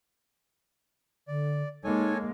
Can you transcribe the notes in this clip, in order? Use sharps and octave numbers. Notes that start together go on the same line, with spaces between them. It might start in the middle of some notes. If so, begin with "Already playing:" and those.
D3 D5
G#3 A#3 D#4 A4 C#5 G#5